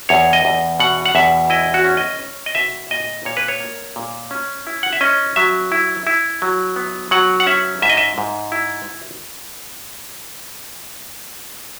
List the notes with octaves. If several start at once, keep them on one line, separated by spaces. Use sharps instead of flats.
E2 C#5
D#5
E2
B2 F#5
F#5
E2 E5
E4 D#5
F#4
C#4
D#5
C#4
D#5
B2 E5
A#2 D#5
A#2 C#5
B4
C#5
A#3
A#2
C#4
E4
F#5
E5
C#4 D#5
F#3 E5
E4
E4
F#3
B3
F#3 F#5
F#5
C#4 E5
G#2 E5
D#5
E5
G#2
E4